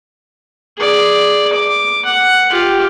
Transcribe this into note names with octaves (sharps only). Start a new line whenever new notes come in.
G#4 D5
D6
F#5
F4 G4